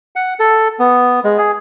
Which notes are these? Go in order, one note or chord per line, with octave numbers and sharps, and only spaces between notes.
F#5
A4
B3
G#3
G#4